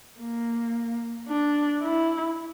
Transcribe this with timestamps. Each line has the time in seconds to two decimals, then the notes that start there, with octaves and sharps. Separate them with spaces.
0.20 A#3
1.29 D4
1.83 E4